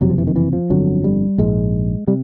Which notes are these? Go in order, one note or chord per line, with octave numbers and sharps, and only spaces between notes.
F#1 F2 C3 F#3
F3
E3
D#3
E3
F3
G1 F2 D3 F#3
G3
A#1 G#2 G#3
C3 G3